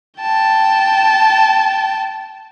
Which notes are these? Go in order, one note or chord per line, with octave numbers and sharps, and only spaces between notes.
G5 A5